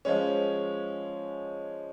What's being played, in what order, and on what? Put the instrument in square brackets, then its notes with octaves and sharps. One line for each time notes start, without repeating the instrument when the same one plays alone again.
[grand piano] F3 G#3 C#4